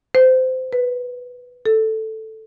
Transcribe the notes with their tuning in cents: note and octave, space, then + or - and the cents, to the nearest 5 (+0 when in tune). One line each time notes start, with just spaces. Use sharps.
C5 -20
B4 +0
A4 +0